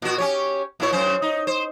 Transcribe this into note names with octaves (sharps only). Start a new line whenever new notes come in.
A#2 F#4
C#4 G4 C#5
A#2 E4 C#5
F#2 C#4 C5
D#4
C5